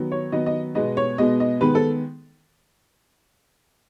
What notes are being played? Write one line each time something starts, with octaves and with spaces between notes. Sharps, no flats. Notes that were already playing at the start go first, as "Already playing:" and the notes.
Already playing: D#3 F#3 B3
C#5
D#3 F#3 B3 D#5
D#5
B2 G#3 B3 D#5
C#5
B2 G#3 B3 D#5
D#5
D#3 G#3 B3 B4
A4